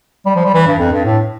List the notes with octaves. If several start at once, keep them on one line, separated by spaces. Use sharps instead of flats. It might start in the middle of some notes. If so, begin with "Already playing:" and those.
G3
F3
G3
E3
G2
F2
G2
A2